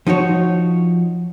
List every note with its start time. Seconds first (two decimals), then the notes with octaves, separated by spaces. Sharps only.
0.07 F3 D#4 F#4 C#5